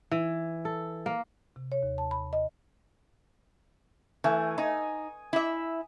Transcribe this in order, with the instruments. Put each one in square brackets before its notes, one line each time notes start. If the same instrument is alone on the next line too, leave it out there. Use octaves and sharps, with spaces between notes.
[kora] E3
A4
A#3
[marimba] C3
C#5
D#2
A5
B5
D#5
[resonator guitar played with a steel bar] E3 [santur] A3 G#5
[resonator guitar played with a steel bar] D#4 [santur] G#5 D#6
[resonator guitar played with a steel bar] E4 E5